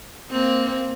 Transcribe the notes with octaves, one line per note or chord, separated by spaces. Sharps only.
A#3 C4